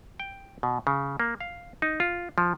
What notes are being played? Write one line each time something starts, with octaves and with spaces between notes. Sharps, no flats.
G5
B2
C#3
A#3
F5
D#4
F4
F3